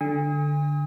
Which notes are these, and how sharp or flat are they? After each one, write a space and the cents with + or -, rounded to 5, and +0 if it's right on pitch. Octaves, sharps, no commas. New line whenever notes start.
D3 +0 G#5 -40 D#6 +35